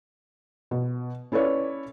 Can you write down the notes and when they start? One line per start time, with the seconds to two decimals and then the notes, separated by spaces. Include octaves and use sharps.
0.71 B2
1.32 C#4 E4 A4 B4 C#5 D5